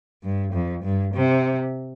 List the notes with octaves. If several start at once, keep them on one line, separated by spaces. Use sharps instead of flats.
G2
F2
G2
C3